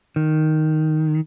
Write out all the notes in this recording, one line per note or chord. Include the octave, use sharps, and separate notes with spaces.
D#3